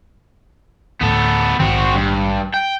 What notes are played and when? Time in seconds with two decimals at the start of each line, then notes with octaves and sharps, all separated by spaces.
1.01 D2 A2 B3 A4
1.60 A#1 G#2 D#3 C4 F#4
1.95 G2
2.54 G5